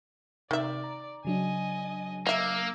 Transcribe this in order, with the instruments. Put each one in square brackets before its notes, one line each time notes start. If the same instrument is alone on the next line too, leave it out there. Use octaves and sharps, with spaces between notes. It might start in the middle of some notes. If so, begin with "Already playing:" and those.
[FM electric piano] C3 [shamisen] D#3 E5 [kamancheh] D5
[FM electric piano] A#5
[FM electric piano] C#3 F#3 D4 [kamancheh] D#5 G#5
[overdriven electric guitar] A#3 [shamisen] D#5 E5 [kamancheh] D6 E6